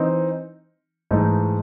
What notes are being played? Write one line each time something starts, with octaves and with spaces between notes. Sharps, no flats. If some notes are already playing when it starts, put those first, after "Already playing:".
Already playing: E3 C4 D#4
G#2 E3 A3 D#4